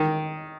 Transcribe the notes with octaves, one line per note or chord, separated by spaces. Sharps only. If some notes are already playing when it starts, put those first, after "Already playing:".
Already playing: D#3